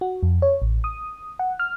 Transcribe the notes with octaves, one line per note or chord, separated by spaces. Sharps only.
F#4
F2
C#5
A1
D#6
F#5
F6